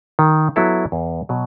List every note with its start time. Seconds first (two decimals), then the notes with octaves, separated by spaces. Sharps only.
0.19 D#3
0.56 F#3 B3 E4 A4
0.92 E2
1.29 B2 F#3